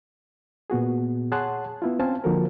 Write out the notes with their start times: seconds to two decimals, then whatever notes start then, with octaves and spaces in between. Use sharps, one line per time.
0.70 A#2 B3 F#4 G#4
1.32 G#4 C#5 F#5 A5 C6 F#6
1.82 B3 E4 F4
1.99 C4 C#4 C5 F5 G#5 A5
2.24 D3 F3 A#3 F#4 A4 A#4